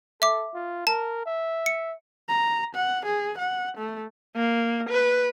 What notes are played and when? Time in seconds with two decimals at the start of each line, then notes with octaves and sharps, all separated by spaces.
0.22 A4 E5 D6
0.54 F4
0.87 A#4 A5
1.26 E5
1.66 C#7
2.29 A#5
2.75 F#5
3.06 G#4
3.38 F#5
3.77 A3
4.36 A#3
4.90 B4